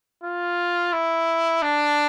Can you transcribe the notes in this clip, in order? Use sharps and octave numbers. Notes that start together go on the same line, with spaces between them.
F4
E4
D4